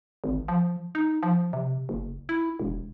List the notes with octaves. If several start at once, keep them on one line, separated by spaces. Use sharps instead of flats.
G#1
F3
D#4
F3
C3
F#1
E4
E1